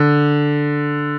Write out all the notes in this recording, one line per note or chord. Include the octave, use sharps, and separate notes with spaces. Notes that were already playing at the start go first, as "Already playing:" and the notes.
Already playing: D3